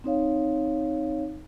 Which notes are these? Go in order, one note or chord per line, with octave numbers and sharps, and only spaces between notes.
C4 D#4 C#5 F5